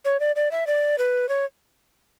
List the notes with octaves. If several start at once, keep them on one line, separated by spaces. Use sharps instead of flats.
C#5
D5
D5
E5
D5
B4
C#5